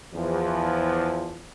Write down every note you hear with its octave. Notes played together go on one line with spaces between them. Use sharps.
E2 F3